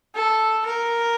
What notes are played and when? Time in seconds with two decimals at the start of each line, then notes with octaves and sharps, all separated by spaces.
0.15 A4
0.66 A#4